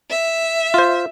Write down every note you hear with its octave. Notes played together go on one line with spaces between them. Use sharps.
E5
F4 C5